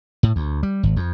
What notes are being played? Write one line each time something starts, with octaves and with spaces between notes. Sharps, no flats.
A2
D2
G3
G#1
F2